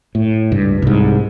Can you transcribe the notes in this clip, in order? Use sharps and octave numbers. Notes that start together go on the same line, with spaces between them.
A2
C#2 G2
C2 G#2